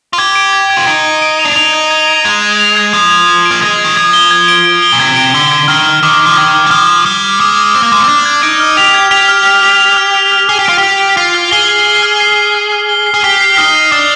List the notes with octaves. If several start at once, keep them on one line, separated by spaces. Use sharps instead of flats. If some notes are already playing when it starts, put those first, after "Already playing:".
F4
G4 G#6
D7
G#6
G#6
F4
D#4 D7
D7
D7
F7
D4
D#4 F7
G#6
G#6
D7
G#3 G#6
G#6
F7
G#6
F3 G#6
G#6
G#6
D7
A#3
G#3 G#6
G#6
D#3
F3 G#6
G7
G#6
D7
D7
G7
A#2
C3 G#6
D7
D3 G7
G#6
D#3 F6
F6
D#3 D6
D6
F3
D#3 G#6
D6
G3
F3 F6
D6
G3 F6
D6
G#3 D6
D6
C4 D6
A#3
G#3 D6
A#3
C4
D4 D6
G#6
D#4 D7
F6
G4 F7
G#6
G4 F7
F6
F6
F7
F7
F6
F6
F6
G#4 F6
G4
F4 D7
G4 F6
D7
F4 C7
F6
G#4 G7
C7
G7
F6
C7
G7
F6
F6
G7
C7
G#4
G4 G7
C7
D#4 F6
C7
D4 D#6